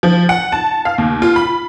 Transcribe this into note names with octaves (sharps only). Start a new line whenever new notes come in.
F3
F#5
A5
F5
D#2
F4
B5